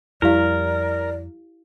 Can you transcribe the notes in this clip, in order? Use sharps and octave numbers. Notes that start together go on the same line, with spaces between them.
F2 G3 E4 G4 A#4 D5 F5